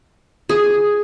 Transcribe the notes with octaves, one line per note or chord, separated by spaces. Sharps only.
G#4